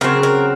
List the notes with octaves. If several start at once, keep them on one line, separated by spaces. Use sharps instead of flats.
C#3 F#3 C4 A#4
A#4